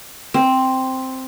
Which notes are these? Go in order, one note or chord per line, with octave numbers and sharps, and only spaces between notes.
C4